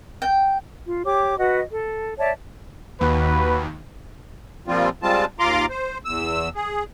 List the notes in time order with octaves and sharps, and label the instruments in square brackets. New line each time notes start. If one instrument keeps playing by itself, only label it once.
[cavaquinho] G5
[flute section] F4
G4 C#5 D6
F#4 B4 D#5 F#5
A4
C#5 D5 E5 A5
[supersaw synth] D#2 [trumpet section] F#4 B4
[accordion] A#2 F3 G3 C4 F4
G3 G#3 C4 F4 A5
D#2 F4 A#5 C6 D6
C5
E2 E6
G#4